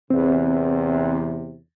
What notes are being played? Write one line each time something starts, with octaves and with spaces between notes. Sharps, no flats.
E2 C3 C4